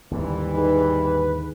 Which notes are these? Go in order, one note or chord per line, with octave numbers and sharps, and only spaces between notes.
D#2 G#2 D3 E3 G3
D#4 G#4 B4